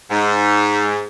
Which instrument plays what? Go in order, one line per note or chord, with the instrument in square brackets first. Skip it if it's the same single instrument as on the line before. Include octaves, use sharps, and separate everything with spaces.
[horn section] G#2